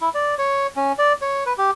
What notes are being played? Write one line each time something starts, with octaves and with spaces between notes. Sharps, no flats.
E4
D5
C#5
C#4
D5
C#5
B4
G4